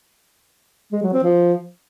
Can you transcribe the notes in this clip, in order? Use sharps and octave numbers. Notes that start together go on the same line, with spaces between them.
G#3
F#3
C4
F3